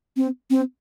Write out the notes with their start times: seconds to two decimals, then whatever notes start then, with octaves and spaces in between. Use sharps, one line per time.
0.17 C4
0.51 C4